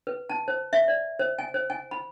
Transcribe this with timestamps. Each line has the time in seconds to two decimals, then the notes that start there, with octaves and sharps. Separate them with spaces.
0.07 B4
0.29 A5
0.48 C5
0.73 E5
0.88 D5
1.19 C5
1.39 G#5
1.54 C5
1.70 G#5
1.91 B5